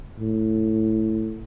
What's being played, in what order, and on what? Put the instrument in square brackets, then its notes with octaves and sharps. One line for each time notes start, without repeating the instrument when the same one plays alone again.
[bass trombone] A2